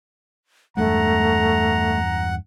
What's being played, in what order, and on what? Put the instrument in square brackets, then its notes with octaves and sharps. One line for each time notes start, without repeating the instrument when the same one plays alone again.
[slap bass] E2 G2 G#3 [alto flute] A3 [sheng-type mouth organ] F#5 [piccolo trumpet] A#5